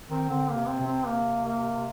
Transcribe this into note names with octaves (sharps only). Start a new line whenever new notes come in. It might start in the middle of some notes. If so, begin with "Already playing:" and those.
D#3 C4
D3 C4
A#3
C3
C4
C3
C4
A#3
A#3